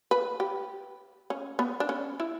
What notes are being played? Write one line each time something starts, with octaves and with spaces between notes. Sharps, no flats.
B4
G4
C#4
B3
D4
C#4
E4